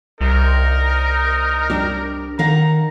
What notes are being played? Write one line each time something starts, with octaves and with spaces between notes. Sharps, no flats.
C2 D#4 A#4
G3 D4 G4
D#3 F5 F#5 A#5